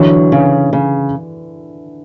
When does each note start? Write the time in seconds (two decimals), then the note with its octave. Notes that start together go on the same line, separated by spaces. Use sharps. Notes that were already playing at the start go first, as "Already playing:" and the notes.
Already playing: D3 E3 F#3
0.32 C#3
0.73 C#3